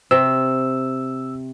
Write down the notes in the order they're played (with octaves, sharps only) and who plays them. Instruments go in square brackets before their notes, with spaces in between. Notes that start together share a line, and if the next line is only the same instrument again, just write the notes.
[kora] C3 [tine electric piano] E6